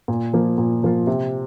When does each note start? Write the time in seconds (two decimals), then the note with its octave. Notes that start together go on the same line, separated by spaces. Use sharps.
0.08 A#2
0.33 F3 A#3 F4
0.58 A#2
0.83 F3 A#3 F4
1.07 C3